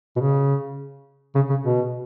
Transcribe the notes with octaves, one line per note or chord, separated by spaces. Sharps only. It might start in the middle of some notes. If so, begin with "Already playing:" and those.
B2
C#3
C#3
C#3
B2